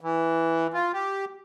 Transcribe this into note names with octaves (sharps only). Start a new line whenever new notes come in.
E3
F4
G4